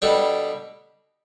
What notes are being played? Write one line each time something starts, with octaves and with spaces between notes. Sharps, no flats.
B2 G3 D4 A4